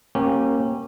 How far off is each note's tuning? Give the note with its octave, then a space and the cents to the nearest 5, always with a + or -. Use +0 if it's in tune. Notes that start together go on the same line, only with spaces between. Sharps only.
A#3 +0 C#4 -25 G4 -25